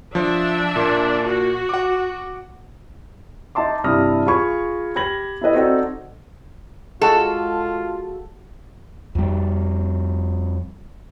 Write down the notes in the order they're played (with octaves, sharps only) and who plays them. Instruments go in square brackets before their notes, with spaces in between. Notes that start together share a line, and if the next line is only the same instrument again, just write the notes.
[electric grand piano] F3 [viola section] D4 E5
[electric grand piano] A#2 A#3
[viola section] F#4
[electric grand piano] F#5 D6
[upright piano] D#4 E5 A5 C6 D6
G2 C3 E4 D#6 F6 A#6
F4 G#4 B5 C#6 G#6
G4 B5 G#6 A#6 F#7
E4 G4 A4 B4 D#5
C4 D#4 F#4 A4 D5 F#5
[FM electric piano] G#3 F#4 [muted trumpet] F4 [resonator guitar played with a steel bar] A4
[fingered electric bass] F2 G3